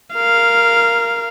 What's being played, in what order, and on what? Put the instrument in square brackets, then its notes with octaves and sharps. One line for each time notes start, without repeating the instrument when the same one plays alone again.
[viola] A#4 F5